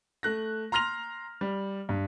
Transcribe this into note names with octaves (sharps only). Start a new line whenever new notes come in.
A3 F#6 A#6
A#5 C6 F6 A#6 F7
G3
G2